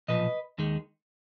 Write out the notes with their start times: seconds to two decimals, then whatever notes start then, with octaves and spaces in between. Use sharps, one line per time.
0.08 B1 A#2 F3 B4 D#5
0.58 D#2 D#3 G#3